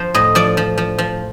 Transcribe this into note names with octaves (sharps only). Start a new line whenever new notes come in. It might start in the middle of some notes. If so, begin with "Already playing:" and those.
Already playing: F3 C5
A2 D#5
F3 D5
F3
F3
F3